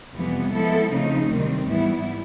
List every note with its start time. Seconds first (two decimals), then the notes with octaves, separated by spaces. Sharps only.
0.14 F2 C3 E3 G3 B3
0.53 F3 G#3 B3 E4 A4
0.91 C#3 F3 A3 C4 D#4
1.29 D2 C3 D#3 G3 C4
1.67 G#2 E3 G3 B3 E4